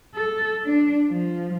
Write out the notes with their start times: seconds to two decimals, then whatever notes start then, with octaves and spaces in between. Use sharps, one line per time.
0.15 A4
0.66 D4
1.10 F3